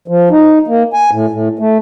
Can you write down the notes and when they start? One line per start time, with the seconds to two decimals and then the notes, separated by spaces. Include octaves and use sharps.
0.08 F3
0.31 D#4
0.68 A#3
0.93 G#5
1.12 A2
1.31 A2
1.59 A3